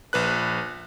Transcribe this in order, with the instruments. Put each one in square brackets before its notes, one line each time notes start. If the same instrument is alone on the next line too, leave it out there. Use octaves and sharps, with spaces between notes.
[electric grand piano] A#1 B4 F#6